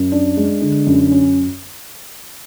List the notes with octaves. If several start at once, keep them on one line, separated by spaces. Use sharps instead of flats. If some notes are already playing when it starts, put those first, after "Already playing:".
Already playing: F#2
D4
G#3
D3
F#2
C#4